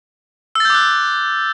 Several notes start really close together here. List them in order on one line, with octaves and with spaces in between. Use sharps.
E6 A6 G6 D6 F#6